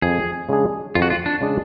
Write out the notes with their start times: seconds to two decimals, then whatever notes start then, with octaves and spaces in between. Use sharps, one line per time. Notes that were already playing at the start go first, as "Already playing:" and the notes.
0.02 F2 G#4
0.49 C#3 G#3 D4 G#4
0.95 F2 F4
1.02 F#4
1.10 F4
1.26 D4
1.41 C#3 G#3 D4 G#4